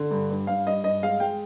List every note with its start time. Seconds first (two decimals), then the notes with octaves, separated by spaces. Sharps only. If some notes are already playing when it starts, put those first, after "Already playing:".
Already playing: D3
0.11 G2
0.30 G2
0.47 G2 F5
0.67 G2 D#5
0.84 G2 D#5
1.02 G#3 F5
1.20 G#3 G5